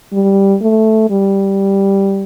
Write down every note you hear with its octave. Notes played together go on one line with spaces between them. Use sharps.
G3
A3
G3